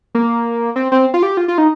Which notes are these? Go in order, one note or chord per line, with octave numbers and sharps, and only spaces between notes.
A#3
C4
C4
F4
G4
F4
F4
D#4